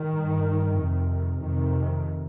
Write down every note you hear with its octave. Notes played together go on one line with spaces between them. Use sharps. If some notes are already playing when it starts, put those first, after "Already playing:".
Already playing: D#3
G2
F2 C3
F2 C3 D#3